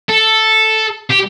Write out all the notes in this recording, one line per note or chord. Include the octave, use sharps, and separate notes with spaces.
A4
G4